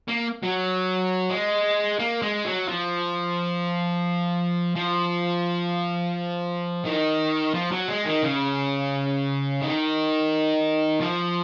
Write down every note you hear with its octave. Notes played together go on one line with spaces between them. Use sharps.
A#3
F#3
G#3
A#3
G#3
F#3
F3
F3
D#3
F3
F#3
G#3
D#3
C#3
D#3
F3